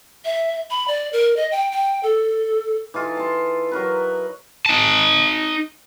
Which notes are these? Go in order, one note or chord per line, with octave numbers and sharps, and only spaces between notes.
E5
B5
D5
A#4
D#5
G5
G5
A4
E3 D#4 F4 A4
A5 C6
F#3 A#4 B4
D#4 A5